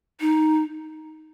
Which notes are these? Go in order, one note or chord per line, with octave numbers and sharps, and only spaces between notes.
D#4